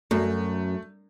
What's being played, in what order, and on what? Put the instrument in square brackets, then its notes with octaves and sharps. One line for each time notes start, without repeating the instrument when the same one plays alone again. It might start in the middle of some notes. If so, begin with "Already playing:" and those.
[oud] F#2 [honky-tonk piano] A3